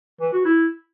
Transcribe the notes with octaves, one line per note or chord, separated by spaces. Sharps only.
E3
F#4
E4